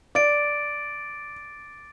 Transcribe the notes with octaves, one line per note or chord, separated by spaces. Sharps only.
D5 D6 A6 D7